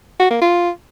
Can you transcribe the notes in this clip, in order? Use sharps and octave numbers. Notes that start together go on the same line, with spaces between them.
F#4
A#3
F4